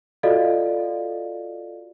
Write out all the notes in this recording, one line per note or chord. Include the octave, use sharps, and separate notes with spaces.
F4 F#4 A4 D5 D#5 F5